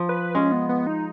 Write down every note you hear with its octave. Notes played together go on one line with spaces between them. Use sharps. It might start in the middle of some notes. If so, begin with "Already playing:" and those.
Already playing: F3
B4
G#3 C#4
B3
B3
D#4